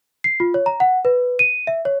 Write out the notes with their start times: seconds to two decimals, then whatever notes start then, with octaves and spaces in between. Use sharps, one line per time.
0.24 C7
0.40 F4
0.54 C#5
0.66 A#5
0.80 F#5
1.05 B4
1.39 D#7
1.67 E5
1.85 C#5